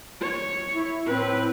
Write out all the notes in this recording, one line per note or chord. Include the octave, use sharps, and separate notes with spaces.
C#5
E4
A2 C4 B4